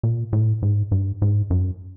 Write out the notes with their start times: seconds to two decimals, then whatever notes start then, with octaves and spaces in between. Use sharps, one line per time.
0.03 A#2
0.33 A2
0.62 G#2
0.92 G2
1.22 G#2
1.50 F#2